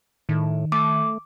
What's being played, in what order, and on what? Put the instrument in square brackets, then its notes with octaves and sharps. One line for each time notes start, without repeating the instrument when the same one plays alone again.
[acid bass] A2 [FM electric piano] D#3
[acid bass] A3 [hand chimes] D6